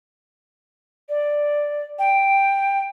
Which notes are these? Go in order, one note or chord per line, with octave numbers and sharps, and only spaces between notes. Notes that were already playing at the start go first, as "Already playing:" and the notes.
D5
G5